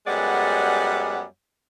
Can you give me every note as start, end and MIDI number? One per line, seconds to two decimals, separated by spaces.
0.07 1.22 42
0.07 1.22 55
0.07 1.22 56
0.07 1.22 59
0.07 1.22 74
0.07 1.22 78